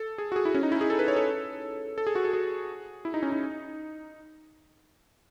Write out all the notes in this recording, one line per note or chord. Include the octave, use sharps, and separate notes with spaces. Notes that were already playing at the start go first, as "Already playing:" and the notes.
Already playing: A4
G#4
F#4
G#4
E4
C#4
D#4
E4
G#4
A4
B4
C#5
A4
A4
G#4
F#4
A4
G#4
E4
D#4
C#4
D#4